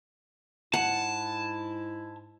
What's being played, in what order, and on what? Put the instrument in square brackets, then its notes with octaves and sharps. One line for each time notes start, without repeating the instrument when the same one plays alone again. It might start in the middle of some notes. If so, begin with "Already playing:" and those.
[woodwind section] G#2 G#3 E4 [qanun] F#5 [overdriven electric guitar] A5